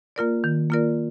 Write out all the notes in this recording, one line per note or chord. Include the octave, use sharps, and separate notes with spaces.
A#3 F4 A#4 D5
D#3
A#3 F4 A#4 D5